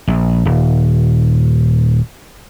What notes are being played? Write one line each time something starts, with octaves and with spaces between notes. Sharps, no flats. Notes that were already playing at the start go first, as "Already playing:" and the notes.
A#1
D#1